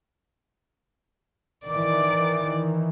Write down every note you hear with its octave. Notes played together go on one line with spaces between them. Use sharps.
D#3 E3 D5 D6